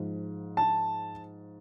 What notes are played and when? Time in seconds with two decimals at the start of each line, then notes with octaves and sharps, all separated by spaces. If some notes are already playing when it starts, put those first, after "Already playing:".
Already playing: G#2 F3
0.57 A5